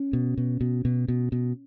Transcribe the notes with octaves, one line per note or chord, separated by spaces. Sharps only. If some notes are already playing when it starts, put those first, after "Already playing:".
Already playing: C#4
B2
B2
B2
B2
B2
B2